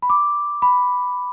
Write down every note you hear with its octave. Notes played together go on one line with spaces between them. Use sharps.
B5
D6
B5